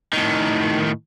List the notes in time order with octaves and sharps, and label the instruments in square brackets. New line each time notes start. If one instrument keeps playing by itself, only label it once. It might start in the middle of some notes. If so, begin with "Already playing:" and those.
[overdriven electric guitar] A2 D#3